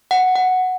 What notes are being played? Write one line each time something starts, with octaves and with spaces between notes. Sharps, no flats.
F#5
F#5